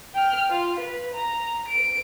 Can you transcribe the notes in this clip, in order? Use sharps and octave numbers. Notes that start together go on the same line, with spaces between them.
G5 F6
F4
B4
A#5
D7